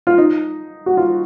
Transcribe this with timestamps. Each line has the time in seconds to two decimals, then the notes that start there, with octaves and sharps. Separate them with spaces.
0.07 F4
0.18 D#4
0.86 F#4
0.97 F4